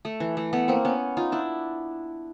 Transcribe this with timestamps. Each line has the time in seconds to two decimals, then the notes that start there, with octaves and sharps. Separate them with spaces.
0.05 A3
0.20 E3
0.37 A3
0.53 A3 B3
0.68 A#3 C4
0.85 B3 C#4
1.17 D#4 F4
1.32 D4 E4